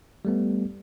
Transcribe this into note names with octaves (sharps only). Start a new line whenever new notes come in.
G3 A3 B3